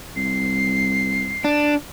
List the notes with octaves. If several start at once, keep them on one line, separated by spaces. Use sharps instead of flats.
C2 C7
D4